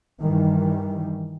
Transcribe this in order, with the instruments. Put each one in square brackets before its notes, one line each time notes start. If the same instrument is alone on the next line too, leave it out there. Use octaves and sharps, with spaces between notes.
[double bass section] G2 D#3 E3 G3